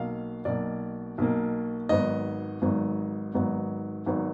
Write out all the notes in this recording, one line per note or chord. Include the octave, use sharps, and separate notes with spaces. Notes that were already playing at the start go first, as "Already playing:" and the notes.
Already playing: B1 B2 A#3 F5
B1 B2 A#3 D5
B1 B2 A#3
G#1 G#2 F#3 B3 D#5
G#1 G#2 F#3 B3
G#1 G#2 F#3 B3
G#1 G#2 F#3 B3